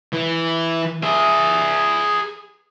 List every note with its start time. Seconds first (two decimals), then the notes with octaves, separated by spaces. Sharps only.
0.13 E3
1.03 G#4 E5